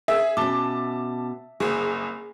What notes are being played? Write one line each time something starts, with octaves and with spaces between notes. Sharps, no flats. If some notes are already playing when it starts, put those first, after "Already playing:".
G#4 E5
B2 C#4 A5 D6
F#1 C2 G#4